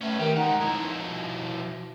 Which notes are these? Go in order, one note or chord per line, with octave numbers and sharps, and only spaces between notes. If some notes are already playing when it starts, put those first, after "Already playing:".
A3 C#4 B4
D#3 G3
G#3 D#4 F#5
F3 E4
B2